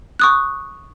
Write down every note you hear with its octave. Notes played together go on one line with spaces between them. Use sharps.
C#6 D#6 F#6